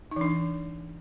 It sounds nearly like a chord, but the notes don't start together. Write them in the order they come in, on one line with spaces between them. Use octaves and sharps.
D#4 E3 D4